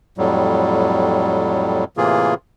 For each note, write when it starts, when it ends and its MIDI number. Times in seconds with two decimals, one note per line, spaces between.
0.18 1.84 41
0.18 1.84 45
0.18 1.84 54
0.18 1.84 55
1.97 2.34 45
1.97 2.34 48
1.97 2.34 52
1.97 2.34 58
1.97 2.34 65
1.97 2.34 68